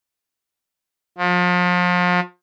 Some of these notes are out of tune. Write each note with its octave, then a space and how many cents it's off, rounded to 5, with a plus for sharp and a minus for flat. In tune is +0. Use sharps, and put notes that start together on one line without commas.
F3 +35